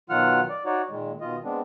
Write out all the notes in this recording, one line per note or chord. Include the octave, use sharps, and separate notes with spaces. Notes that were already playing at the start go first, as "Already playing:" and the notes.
B2 D#3 F#3 F4 F#5 F6
D5
D#4 F#4 C#5 D5
A#2 D#3 G#3
B2 D#3 F4 D#5
G#3 B3 C4 D4